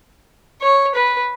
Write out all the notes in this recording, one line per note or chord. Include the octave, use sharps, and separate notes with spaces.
C#5
B4